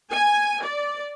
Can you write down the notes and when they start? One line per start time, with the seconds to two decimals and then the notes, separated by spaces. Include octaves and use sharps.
0.12 G#5
0.64 D5